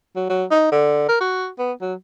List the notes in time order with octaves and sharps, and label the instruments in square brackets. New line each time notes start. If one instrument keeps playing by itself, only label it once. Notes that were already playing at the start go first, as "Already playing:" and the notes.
[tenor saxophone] F#3
F#3
D#4
D3
A#4
F#4
B3
F#3